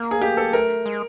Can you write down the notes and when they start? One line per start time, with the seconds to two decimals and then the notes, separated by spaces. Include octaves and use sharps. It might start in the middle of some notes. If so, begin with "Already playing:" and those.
Already playing: A#3
0.11 G#4
0.22 G4
0.37 A4
0.53 A3 A#4
0.86 G#3